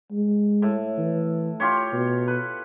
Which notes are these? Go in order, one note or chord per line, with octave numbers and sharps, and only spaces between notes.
G#3
A2
E3
F4 G4 C#5
B2
B4